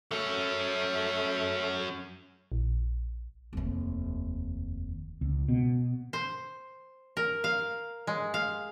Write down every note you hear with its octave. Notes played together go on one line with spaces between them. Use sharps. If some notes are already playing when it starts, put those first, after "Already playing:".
F#3 A3 C#4
A#1
F1 D#2
C#2
B2
C5
A#4
F5
G#3
F5